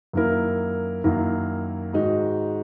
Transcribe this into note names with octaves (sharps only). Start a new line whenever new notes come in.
F#2 D#3 A#3 E4 A#4
F#2 D#3 A#3 E4 A#4
G#2 D#3 G#3 D#4 F#4